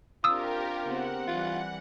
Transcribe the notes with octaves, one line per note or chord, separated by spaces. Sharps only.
C4 D4 F4 G4 A#4 D#6 E6
C#3 B3 C4 F#5
E3 G3 F4